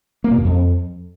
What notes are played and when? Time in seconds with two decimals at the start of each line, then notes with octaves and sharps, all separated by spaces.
0.24 A#3
0.31 B2
0.38 F#2
0.45 F2